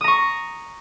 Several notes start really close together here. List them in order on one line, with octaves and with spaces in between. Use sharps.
D#6 A#5 C#6